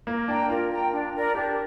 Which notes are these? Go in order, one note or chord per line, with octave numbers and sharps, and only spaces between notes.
A#3 A#4
D4 G5 A#5
F4 A#4
G5 A#5
D4
A#4 D5
D4 G4